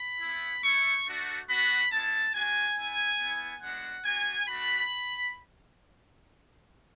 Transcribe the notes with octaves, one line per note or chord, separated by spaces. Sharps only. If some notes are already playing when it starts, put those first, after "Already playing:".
Already playing: B5
E4
B3
A3 E4 C#6
A3 D4 F#4
B3 F#4 B5
G#3 B3 E4 A5
A3 D4 F#4 G#5
B3 E4
B3 E4
G#3 B3 D4 F#4 F#5
B3 D4 F#4 G#5
A3 D4 F#4 B5